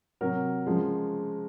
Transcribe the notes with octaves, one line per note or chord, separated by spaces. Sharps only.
C3 F#3 F#4 A#4
C#3 F3 G#3